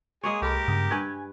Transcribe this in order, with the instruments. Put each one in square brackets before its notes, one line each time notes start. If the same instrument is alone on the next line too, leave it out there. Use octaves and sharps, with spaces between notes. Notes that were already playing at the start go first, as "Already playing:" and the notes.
[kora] G#3 A#3 C#5 [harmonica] G#4
[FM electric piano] C2 A4 B5 [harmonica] G4 A#4
[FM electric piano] G2 C#3 D#6
[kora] G2 B4 [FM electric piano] G#5 G#6